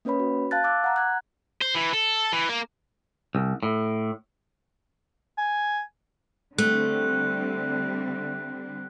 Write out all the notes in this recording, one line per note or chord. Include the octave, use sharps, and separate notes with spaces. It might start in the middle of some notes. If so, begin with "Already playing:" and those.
A#3 C#4 B4 C#5 B5
F#4
F5 A5 F#6 A6
D6 E6 F#6
F#5 A#5
F#6 G#6
C5
E3
A4
E3
A#3
C2
A2
G#5
D3 G3 A3 C4 F#6